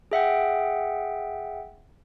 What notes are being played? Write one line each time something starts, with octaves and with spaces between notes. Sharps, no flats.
G#4 E5 F#5 G5